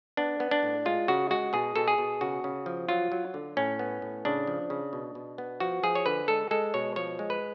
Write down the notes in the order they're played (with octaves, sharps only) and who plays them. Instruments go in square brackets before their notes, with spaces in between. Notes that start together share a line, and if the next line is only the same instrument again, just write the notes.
[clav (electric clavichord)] B3 D4
B3
D4
A2
G#3 F4
C#3 F#4
G#3 F#4
B2 G#4
B2 A4
G#4
B2
C#3 F#4
C#3
F3
F#3 F4
F#3
D3
A2 C#4
B3
A2
C#3 D4
F3
C#3
B2
B2
B3
F3 F#4
F3 G#4
C#5
D3 B4
G#3 A4
G#3 A4
B2 C#5
F3 C#5
G#3
B4